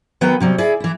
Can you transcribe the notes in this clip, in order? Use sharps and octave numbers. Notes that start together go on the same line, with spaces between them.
D#3 F#3 B3 B4 F#5 G5
C3 F#3 G3
E4 G#4 D5
E3 E4